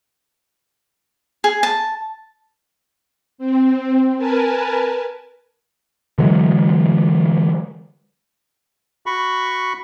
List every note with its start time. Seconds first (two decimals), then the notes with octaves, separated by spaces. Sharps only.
1.44 G#4
1.63 A5
3.38 C4
4.17 A#4 B4 G#5 A5
6.18 D3 E3 F#3 G#3
9.06 F#4 B5 C#6